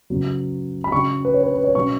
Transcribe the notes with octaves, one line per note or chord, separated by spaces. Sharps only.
F#2 C#3 F#3 B3
B5
C#3 F#3 C#4 C#6
B4
C#5
B4
B4
C#5
B2 F#3 C#4 C#6